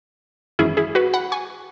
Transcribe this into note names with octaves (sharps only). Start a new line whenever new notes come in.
G#1 F#2 E3 C#4 E4 G#4
E4 G#4
F#4 B4
F#5 B5
G#5 C#6